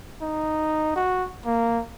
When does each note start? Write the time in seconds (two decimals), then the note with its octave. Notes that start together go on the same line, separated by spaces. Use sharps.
0.22 D#4
0.96 F#4
1.45 A#3